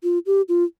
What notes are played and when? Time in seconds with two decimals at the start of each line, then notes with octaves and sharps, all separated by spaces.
0.03 F4
0.26 G4
0.49 F4